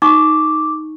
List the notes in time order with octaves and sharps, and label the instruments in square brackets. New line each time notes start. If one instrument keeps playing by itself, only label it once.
[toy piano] D#4 C#6 [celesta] D6